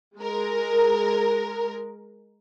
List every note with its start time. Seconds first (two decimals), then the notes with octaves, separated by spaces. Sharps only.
0.18 G#3 A#4